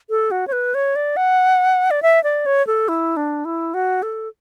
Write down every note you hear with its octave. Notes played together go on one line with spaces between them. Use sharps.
A4
F#4
C#5
B4
C#5
D5
F#5
D5
E5
D5
C#5
A4
E4
D4
E4
F#4
A4